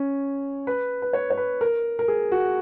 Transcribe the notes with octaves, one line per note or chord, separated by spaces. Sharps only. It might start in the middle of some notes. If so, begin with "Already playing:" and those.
Already playing: C#4
B4
B4
C#5
C#5
B4
A#4
A#4
G#4
F#4